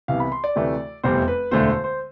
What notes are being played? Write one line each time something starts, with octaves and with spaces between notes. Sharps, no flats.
C2 C3 E3 B3 F5
B5
C6
D5
D2 C3 E3 A3
F1 E2 C3 G3 C4 C5
B4
E1 D2 D3 A3 C5
C5
C5